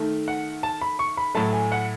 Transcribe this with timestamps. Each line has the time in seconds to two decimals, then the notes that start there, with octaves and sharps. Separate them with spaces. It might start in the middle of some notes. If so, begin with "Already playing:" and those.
Already playing: D#3 A3
0.28 F#5
0.63 A5
0.81 B5
0.99 C#6
1.17 B5
1.35 A2 F#3 A3 A5
1.53 G#5
1.72 F#5